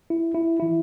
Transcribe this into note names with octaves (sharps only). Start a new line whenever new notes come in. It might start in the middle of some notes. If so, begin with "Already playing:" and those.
E4
E4
E3 E4